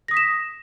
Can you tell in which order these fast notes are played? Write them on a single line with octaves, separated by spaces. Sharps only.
A#6 D#6 B6 E7